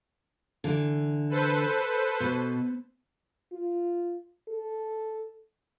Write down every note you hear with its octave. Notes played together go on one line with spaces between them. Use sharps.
D3 E3
A4 B4 C5
B2
F4
A4